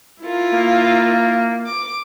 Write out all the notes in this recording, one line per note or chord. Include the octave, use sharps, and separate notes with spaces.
E4 F4 A#4
A#3
D6